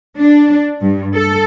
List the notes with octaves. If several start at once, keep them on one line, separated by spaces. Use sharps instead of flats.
D4
G2
A4